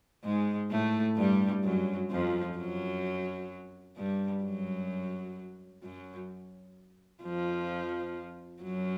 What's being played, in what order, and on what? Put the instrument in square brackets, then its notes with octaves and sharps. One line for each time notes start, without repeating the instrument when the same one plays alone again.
[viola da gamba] G#2 G#3
A2 A3
G2 G3
F#2 F#3
F2 F3
F#2 F#3
G2 G3
F#2 F#3
F#2 F#3
F2 F3
F#2 F#3